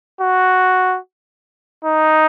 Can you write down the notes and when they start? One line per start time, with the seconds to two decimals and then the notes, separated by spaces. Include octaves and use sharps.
0.21 F#4
1.85 D#4